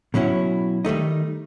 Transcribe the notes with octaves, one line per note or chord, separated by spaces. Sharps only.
B2 F#3 C#4 E4 F#4
D#3 G3 A3 D#4